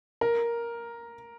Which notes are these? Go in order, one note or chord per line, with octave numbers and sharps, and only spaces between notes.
A#4